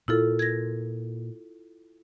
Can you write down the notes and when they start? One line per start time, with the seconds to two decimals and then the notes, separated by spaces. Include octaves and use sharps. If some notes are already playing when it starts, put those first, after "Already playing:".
0.08 A#2 E4 F4 A4
0.39 G#6 A#6